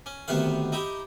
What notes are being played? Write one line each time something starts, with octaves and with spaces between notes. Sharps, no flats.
C#4
D2 C3 D#3 B3 B4 F5
D#4 E4 G4